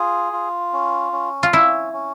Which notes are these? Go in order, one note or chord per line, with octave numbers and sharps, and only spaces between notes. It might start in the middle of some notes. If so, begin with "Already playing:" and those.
Already playing: F4 G#4
F4
C#4
C#4
F4
C#4 E4
C#4